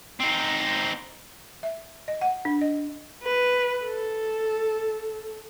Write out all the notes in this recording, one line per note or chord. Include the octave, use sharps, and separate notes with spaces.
C4 D#4
E5
D#5
F#5
D4
D#5
B4
A4